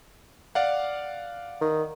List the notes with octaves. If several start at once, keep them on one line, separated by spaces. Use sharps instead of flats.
D5 F5 F#5
D#3